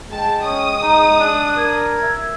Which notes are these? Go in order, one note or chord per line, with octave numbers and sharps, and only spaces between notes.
G#3 G5 A5
C#4 D#6
D#4 A#5
D4 F#6
A#4 G#6
E5